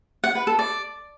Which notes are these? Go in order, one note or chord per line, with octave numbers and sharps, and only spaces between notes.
F#5
B4
A4
D5